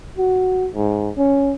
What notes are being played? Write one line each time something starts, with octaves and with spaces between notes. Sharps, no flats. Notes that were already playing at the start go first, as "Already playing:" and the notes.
F#4
G#2
C#4